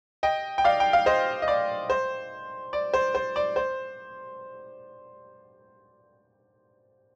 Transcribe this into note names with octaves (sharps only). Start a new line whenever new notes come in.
D#5 G5
G5
D5 F5
G5
F5
C5 D#5
D#5
D5
C5
D5
C5
C5
D5
C5